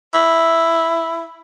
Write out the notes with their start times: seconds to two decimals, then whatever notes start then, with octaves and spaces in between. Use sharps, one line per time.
0.14 E4